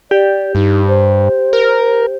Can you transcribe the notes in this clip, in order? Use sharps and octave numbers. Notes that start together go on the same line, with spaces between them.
G4 D5
G2 D#4
C5
A#4